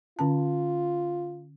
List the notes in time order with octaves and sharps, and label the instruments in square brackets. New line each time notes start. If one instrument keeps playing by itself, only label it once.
[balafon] D3 C#4 A5 [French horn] F4